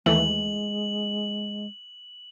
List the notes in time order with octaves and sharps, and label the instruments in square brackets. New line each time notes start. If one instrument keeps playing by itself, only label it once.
[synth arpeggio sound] D#2 E3 A3 [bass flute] G#3 [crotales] F#7